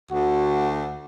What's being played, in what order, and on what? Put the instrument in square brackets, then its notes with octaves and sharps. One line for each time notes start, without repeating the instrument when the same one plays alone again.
[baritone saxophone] D2 [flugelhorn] F#4